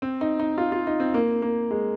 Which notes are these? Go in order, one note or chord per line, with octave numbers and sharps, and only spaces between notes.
C4
D#4
D#4
F4
F4
D#4
C4
A#3
A#3
G#3